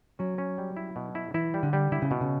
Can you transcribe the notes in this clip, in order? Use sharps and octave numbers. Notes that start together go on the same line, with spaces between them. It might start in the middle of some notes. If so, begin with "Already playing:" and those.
F#3 C#4
C#4
G3
E4
B2
E4
E3 E4
G3
D3
G3
D3 E4
C#3
B2
C#3